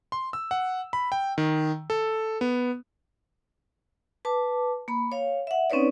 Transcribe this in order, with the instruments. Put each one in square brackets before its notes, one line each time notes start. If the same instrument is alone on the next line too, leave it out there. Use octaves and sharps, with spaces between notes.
[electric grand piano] C6
E6
F#5
B5
G5
D#3
A4
B3
[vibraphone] B4 A5 D6
A#3 B5
C#5 F5
E5 F#5
C4 C#4 D#4 B4 C#5 D5